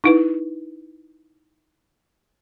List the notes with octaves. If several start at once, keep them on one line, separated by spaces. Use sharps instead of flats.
D#4 E4 B4